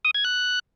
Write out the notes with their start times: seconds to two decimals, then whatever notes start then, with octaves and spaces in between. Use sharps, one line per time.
0.05 D#6
0.15 G#6
0.24 F#6